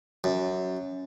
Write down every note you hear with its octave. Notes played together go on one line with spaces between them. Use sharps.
F#2